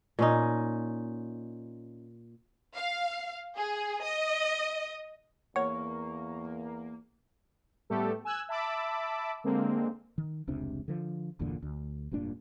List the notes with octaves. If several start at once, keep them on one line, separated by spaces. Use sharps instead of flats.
A#2 C#4 D#4
F5
G#4
D#5
E2 A#3 C#5 F#5 C#6
A2 G3 A3 B3 G4 A4
G#5 E6 F#6 G#6
E5 A5 B5 D6 E6
D3 G#3 A#3 C4
D#3
F1 C#2 C3 D4
D3 F3
G1 E2 A#2 D3
D2
F1 G2 A#2 D4